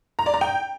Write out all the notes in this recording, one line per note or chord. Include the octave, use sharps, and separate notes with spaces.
A#5
D5
A#5
G5